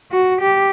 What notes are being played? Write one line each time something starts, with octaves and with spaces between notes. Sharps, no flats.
F#4
G4